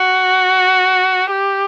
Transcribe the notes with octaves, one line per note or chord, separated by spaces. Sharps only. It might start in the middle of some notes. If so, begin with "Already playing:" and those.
Already playing: F#4
G4